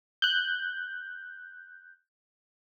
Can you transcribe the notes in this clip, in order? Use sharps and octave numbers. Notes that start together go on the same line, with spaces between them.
F#6 G6